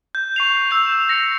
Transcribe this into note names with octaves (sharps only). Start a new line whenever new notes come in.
G6
C#6 C7 F7
E6 G6 F7
E7
A#6 C#7